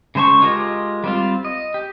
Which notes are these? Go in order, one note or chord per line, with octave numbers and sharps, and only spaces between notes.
C#3 G#3 C5 A5 C#6
G#3 F4 G4 A#4 D#5
G3 C4 F4
D#5
G4